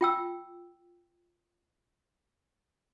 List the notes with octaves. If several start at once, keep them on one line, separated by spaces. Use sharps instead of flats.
F4 G5 E6